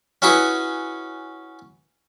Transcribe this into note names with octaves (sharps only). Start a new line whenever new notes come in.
C#4 E4 F#4 G#4 B4